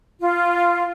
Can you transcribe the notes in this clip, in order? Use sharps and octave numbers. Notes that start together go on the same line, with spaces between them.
F4